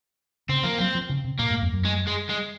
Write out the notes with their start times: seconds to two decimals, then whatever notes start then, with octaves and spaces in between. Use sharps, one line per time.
0.49 C#3 C4
0.63 F3 A#3
0.78 F#3 C4
0.95 F3
1.10 C#3
1.24 C3
1.39 A#2 A#3
1.50 G#2
1.62 F2
1.73 F#2
1.85 G#3
2.07 G#3
2.29 G#3